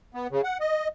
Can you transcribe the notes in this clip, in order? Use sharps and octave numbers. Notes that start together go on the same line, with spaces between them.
B3
C#3
F#5
D#5